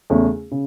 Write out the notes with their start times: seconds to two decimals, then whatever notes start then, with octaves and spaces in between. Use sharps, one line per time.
0.10 E2 C#3 A3 C#4
0.51 C#3